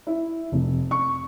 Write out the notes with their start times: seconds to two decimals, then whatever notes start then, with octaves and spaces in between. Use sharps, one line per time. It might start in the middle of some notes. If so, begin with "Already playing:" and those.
0.07 E4
0.52 F1
0.91 C#6